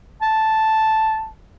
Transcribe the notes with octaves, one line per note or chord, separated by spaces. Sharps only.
A5